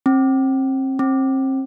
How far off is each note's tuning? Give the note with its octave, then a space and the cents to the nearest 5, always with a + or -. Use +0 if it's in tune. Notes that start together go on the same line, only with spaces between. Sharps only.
C4 +35
C4 +35